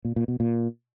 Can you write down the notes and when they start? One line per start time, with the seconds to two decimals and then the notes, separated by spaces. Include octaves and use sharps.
0.05 A#2
0.16 A#2
0.28 B2
0.40 A#2